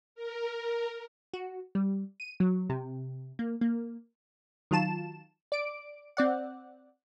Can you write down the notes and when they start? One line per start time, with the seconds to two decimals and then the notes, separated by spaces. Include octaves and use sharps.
0.15 A#4
1.33 F#4
1.75 G3
2.20 D#7
2.40 F#3
2.70 C3
3.39 A#3
3.61 A#3
4.71 D#3 F#3 F4 A5 E7
5.52 D5 D7
6.17 C4 D5 F#5